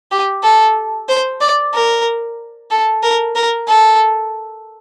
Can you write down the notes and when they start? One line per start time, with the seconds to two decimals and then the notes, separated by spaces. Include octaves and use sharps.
0.11 G4
0.43 A4
1.08 C5
1.41 D5
1.74 A#4
2.71 A4
3.03 A#4
3.35 A#4
3.68 A4